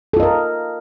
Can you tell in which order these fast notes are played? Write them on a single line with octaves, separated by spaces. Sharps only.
A4 F4 D#5 A#4